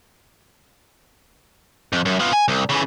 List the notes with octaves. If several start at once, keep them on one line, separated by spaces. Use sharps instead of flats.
F2
F#2
B3 F4
G#5
C2
C#3 E3